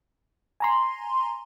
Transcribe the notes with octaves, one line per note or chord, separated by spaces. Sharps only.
G#5 A#5 C6